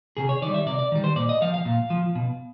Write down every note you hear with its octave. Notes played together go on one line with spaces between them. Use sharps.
C3 G#4
C#5
D#3 G3 D5
E5
C3 D5
D5
D#3 G3
C5
A#2 D5
D#5
F3 F5
F5
A#2
F3
B2